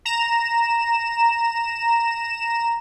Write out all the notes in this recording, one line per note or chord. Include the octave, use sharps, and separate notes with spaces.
A#5 E7